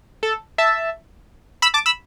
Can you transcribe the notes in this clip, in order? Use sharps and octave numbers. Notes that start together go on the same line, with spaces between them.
A4
E5 A5
B5 E6
A5 D6
B5 E6